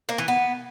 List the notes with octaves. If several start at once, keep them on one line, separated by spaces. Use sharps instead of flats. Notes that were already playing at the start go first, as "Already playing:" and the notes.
A#3
E3
B3